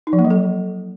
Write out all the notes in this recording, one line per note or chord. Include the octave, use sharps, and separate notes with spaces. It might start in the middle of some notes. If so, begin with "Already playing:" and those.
D#4
F3
A#3
F#3
A4